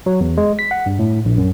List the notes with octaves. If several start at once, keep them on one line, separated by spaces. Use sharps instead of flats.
F#3
E2
G#3
B6
F#5
G2
A2
A#1
F#2